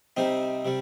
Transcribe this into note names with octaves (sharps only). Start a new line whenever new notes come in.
C3 G3 C4 D#4
C3 G3